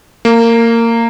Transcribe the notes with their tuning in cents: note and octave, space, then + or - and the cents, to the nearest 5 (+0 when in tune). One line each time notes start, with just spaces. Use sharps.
A#3 -20